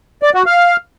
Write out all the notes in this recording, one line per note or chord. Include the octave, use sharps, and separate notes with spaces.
D5
F#4
F5